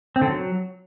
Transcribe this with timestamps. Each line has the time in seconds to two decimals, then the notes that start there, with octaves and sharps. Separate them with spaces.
0.16 C4
0.22 D3
0.27 F#3